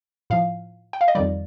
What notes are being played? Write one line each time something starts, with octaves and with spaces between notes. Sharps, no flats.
A2 F3 F5
G5
F5
D#5
F2 D#3 G3 D5